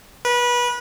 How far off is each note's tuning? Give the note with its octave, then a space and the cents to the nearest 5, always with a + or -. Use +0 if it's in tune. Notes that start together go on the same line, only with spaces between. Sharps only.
B4 -25